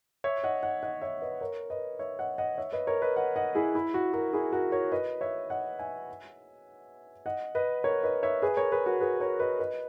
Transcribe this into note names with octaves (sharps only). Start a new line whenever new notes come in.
C#5 E5
D#5 F#5
D#5 F#5
D#5 F#5
C#5 E5
B4 D#5
A#4 C#5
B4 D#5
C#5 E5
D#5 F#5
D#5 F#5
C#5 E5
B4 D#5
A#4 C#5
B4 D#5
D#5 F#5
D#5 F#5
E4 G#4
E4
F#4
F#4 A#4
E4 G#4
F#4 A#4
A#4 C#5
B4 D#5
C#5 E5
D#5 F#5
E5 G#5
D#5 F#5
B4 D#5
A#4 C#5
B4 D#5
C#5 E5
G#4 B4
A#4 C#5
G#4 B4
F#4 A#4
G#4 B4
A#4 C#5
B4 D#5
B4 D#5